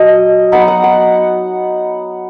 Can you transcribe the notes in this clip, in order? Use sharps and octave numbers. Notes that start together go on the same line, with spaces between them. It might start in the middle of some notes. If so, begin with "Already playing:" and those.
Already playing: F#3 D#5
F#3 B3 D#4 F#5
F#5
F#5